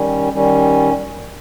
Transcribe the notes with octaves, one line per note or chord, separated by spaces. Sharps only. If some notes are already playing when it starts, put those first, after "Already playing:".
Already playing: D#3 G3 C#4
D#3 G3 C#4